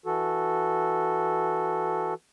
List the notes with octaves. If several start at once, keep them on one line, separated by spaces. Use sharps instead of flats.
E3 F#4 A4